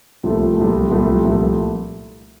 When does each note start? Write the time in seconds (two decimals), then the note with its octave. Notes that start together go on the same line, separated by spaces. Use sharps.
0.23 C2 A#2 F3 A3
0.57 C2 A#2 F3 A3
0.90 C2 A#2 F3 A3
1.24 C2 A#2 F3 A3